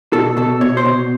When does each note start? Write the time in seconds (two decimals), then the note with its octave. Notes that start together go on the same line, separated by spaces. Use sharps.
0.13 B2 A4
0.37 B2 A4
0.61 B2 C#5
0.77 C5
0.85 B2